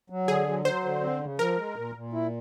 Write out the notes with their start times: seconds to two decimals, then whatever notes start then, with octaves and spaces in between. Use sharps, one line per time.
0.10 F#3
0.27 D3 G#4
0.47 F#3
0.65 F#3 C5
0.84 D3
1.01 C4
1.21 C#3
1.39 F3 A#4
1.57 G#3
1.76 A#2
1.95 A#2
2.13 E4